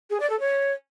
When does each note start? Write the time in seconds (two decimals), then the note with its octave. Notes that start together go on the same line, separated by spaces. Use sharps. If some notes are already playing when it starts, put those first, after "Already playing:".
0.10 G#4
0.20 D5
0.30 A4
0.39 C#5